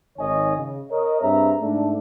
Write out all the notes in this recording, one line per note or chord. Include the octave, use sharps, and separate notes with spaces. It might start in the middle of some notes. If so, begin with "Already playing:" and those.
G#1 D#3 C#5 D#5 G#5
C#3
A#4 C#5 D#5
G2 C4 G#4 E5 A#5
G#2 A3 D4